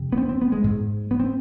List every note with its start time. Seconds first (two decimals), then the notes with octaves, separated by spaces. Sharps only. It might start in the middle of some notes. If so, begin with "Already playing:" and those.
Already playing: F2 C3
0.13 B3
0.18 C4
0.29 C4
0.41 B3
0.52 G#3
0.64 G#2
1.11 B3
1.20 C4